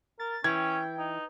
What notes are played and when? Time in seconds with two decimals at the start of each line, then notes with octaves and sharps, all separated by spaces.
0.19 A#4 A6
0.44 E3 C#4 G5 G#6
0.98 D#4